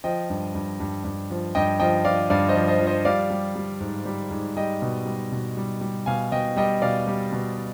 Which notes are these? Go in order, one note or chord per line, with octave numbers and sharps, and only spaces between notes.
F3 D#5 G5
G2
G2
G2
G2
F3
G2 D#5 G5
F3 D#5 G5
F3 D5 F5
G2 D5 F5
C5 D#5
F3
C5 D#5
F3
C5 D#5
G3 D5 F5
G3
G3
G#2
G3
G#2
G3 D#5 G5
B2
G3
B2
G3
G3
B2 F5 G#5
B2 D#5 G5
G3 D#5 G5
B2 D5 F5
G3
B2